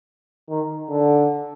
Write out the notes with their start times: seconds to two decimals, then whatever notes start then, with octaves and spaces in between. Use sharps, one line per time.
0.50 D#3
0.90 D3